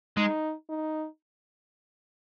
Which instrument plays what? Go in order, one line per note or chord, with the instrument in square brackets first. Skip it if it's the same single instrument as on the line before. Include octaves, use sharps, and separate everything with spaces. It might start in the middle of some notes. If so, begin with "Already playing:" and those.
[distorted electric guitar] G#3 [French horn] D#4
[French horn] D#4